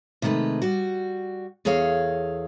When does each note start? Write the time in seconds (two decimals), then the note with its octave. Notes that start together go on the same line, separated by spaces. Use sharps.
0.22 C3 D#3 G#3 A3 B4
0.62 G3 F#4
1.65 E2 G#4 A4 C#5 F5